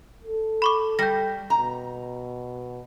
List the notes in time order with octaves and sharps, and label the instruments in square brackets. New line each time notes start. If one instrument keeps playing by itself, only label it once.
[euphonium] A4
[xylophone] B5 C#6 D6
[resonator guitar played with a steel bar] G3 [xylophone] G6 A#6
[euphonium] B2 [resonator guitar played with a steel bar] A#5